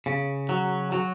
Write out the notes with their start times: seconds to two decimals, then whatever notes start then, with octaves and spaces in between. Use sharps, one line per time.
0.06 C#3
0.49 F#3
0.92 F#3